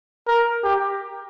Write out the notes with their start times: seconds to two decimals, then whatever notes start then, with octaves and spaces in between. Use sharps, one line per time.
0.27 A#4
0.64 G4